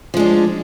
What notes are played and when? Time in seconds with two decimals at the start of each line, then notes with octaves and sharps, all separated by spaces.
0.14 F3
0.17 G#3
0.19 D4